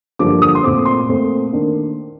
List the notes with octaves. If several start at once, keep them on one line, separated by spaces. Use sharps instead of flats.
G2 D3 F3 A#3 D6
D#6
C6
A#2 A3 C4 D6
C6
A#2 A3 C4
D#3 A#3 D4